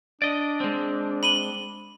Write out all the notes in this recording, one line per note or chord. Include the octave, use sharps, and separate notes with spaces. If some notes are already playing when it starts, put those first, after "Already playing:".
D4 D5 D#5
G#3 C4
B5 D#7 G7